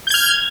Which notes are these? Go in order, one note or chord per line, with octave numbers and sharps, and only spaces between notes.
F6 G6 G#6